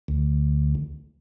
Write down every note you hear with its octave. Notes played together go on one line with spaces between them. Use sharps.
D2